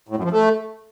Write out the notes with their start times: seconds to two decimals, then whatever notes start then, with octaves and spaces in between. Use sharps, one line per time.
0.09 A2
0.16 F#2
0.24 F3
0.32 A3